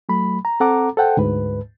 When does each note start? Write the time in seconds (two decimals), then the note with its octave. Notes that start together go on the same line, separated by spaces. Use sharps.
0.09 F#3 A3 B5
0.45 A#5
0.60 C4 A4 F#5 A#5 D6
0.97 A4 C5 F#5 G5
1.17 D2 G#2 B4